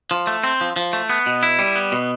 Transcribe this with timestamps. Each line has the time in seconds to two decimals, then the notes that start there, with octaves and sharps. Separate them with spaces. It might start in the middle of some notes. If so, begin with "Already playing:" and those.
0.11 F3
0.27 A3
0.44 C4
0.61 F3
0.76 F3
0.93 A3
1.10 B3
1.26 B2
1.43 E4
1.59 G3
1.75 B3
1.92 B2